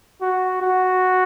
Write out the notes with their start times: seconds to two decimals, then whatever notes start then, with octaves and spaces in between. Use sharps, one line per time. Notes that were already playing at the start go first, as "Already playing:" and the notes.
0.21 F#4
0.62 F#4